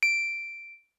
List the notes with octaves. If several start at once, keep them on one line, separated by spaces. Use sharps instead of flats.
D7